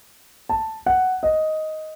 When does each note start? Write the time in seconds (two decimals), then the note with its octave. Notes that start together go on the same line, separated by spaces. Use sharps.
0.49 A5
0.86 F#5
1.23 D#5